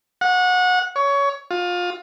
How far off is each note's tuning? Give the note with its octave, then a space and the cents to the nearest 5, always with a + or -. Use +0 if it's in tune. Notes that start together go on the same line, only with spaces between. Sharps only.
F#5 -25
C#5 +20
F4 +25